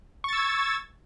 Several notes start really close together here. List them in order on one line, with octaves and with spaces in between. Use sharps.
C#6 A6 E6 G#6